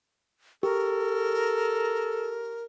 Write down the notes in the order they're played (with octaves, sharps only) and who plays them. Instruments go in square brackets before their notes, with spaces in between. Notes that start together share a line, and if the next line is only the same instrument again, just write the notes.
[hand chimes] G4 [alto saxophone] A4 [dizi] A#4